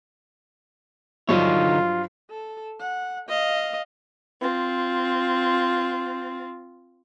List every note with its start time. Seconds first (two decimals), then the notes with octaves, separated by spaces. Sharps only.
1.29 G2 D3 F3 F#3 D#4 F4 C#5
2.30 A4
2.80 F#5
3.29 D#5 F5
4.41 C4 F4